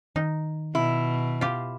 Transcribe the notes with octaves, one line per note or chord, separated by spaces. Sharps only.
D#3 D#4
B2 E4
F4 G4